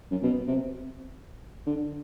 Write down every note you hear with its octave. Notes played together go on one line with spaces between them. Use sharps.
F#2
B2
C3
D3